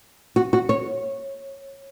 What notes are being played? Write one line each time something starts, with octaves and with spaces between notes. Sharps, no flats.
F#4
F#4
C#5